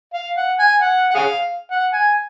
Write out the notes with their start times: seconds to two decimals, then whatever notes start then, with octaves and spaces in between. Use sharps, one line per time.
0.14 F5
0.37 F#5
0.59 G#5
0.82 F#5
1.11 F#5
1.15 G#4 F5
1.71 F#5
1.93 G#5